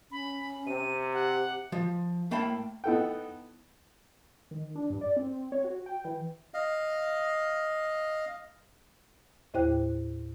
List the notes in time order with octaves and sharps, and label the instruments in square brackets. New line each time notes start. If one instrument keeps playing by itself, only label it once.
[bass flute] C#4 [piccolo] B5
[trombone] C3 [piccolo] D#7
[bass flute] G4 [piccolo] F#5
[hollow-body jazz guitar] F3
A2 A3 A#3 G5 A5 B5
[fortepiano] B3 D#4 E4 A4 F#5 G5
[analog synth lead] D#3
D4
G2
D5
C4
C#5
F#4
G5
E3
[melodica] D#5 F5
[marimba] D#2 A2 E4 C5 G5 F#6